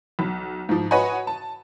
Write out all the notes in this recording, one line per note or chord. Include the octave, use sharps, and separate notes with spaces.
B1
G#2 F3
F#4 B4 C#5 D#5 F#5 G#5
A5